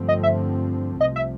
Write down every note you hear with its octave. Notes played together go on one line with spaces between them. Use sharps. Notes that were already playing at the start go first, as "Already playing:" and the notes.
Already playing: G2 D3 F3 A3 C4
D#5
E5
C2 C3 F3 D#5
E5